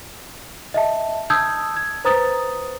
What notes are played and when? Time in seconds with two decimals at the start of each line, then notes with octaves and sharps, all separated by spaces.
0.74 D#5 E5 A5
1.30 A5 D#6 E6 G6 G#6
1.76 G#6
2.05 B4 C5 A#5 D#6 A6